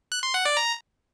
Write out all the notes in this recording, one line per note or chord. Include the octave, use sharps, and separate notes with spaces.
F#6
C6
F#5
D5
A#5